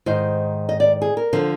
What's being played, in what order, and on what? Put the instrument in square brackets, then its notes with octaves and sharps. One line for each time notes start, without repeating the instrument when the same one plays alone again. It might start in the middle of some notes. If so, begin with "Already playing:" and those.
[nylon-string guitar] G#2 D#3 C5
D#5
D5
G#4
A#4
D3 F3 C5